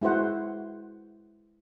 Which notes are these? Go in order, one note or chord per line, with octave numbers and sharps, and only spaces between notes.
G#3 E4 F#4 C5 F#5